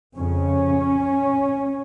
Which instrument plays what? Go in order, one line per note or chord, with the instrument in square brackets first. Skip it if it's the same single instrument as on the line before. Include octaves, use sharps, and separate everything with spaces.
[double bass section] F2 C#3 C#4